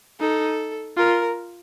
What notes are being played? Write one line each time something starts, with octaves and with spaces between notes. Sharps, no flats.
D#4 A4
F4 A#4